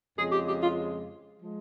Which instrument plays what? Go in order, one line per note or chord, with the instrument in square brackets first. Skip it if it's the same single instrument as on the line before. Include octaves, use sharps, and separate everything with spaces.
[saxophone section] F2 C#3 G#3 G#4
G4
G4
F4
F3 G#3